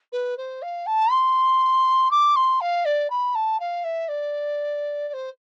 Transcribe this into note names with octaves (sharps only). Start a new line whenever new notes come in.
B4
C5
F5
A5
C6
D6
C6
F5
D5
B5
A5
F5
E5
D5
D5
C5